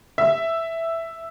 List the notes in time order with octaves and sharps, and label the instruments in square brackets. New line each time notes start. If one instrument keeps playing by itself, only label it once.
[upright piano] E5